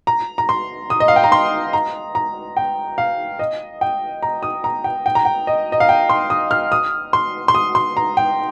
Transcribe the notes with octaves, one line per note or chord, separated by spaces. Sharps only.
A#5
A#5
C6
D#6
D#5
F5
G5
A#5
C6
A#5
A#5
G5
F5
D#5
G5
A#5
D#6
A#5
G5
G5
A#5
G5
D#5
D#5
F5
G5
C6
D#6
F6
D#6
C6
C6
D#6
C6
A#5
G5